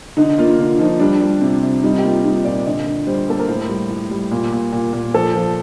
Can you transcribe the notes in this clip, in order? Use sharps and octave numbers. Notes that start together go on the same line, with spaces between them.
D3 D#4
A#3 F4
D3
F3 D#4
G3 D4
G3
C3
C3
G3 D#4
G4
A#3 F4
G3 D#4
A#2 D5
D3 D#5
D3
G3 C5
A#3 A4
A#4
A2 C5
G3
A2
G3
A#2
A#2
A#2
A#2
F3 A4
F3